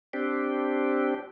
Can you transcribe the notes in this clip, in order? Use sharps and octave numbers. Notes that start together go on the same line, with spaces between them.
C4 D4 G4